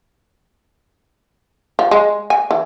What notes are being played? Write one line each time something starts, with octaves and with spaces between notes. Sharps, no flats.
F3
G#3
G#5
E3